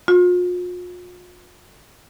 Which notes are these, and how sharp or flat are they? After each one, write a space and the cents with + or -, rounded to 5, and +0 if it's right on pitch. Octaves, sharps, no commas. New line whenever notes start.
F4 +40